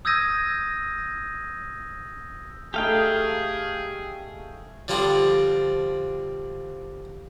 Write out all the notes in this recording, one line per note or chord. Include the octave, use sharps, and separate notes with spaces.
D#6 E6 G6 G#6 A#6 D#7
A3 D#4 G4 G#4 F5 G5
D3 F3 G3 C4 D4